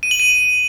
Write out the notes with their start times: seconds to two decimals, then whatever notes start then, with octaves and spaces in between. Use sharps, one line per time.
0.03 D#7
0.11 F#7
0.20 D#7